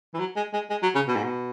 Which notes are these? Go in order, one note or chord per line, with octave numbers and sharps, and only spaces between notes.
E3
F#3
G#3
G#3
G#3
F#3
C#3
B2
G#2
B2